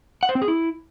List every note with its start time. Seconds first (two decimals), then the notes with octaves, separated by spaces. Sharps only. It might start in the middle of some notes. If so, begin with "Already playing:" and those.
0.23 F#5
0.29 C5
0.35 C4
0.42 G#4
0.48 E4